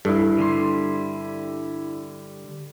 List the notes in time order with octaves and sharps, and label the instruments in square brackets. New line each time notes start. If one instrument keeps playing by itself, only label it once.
[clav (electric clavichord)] G2 [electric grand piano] E4 A4
[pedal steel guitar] D3 G3 C6